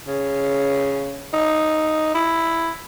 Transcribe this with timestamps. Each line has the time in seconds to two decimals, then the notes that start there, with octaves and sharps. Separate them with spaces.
0.07 C#3
1.33 D#4
2.15 E4